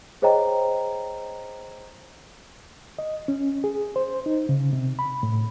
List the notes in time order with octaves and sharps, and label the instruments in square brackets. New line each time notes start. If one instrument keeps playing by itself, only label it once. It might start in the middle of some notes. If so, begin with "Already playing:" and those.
[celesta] G#4 C5 C#5 D#5 G5 A#5
[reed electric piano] D#5
C#4
G#4
C5
D#4
C#3
C3
B5
A2